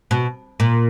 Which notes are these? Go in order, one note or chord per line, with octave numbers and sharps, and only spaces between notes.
B2
A#2